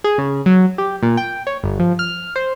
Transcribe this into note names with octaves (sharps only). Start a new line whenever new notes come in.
G#4
C#3
F#3
G4
A#2
G5
C#5
G1
F3
F6
C5